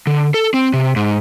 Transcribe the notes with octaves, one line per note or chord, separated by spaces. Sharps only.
D3
A4
C4
C3
G#2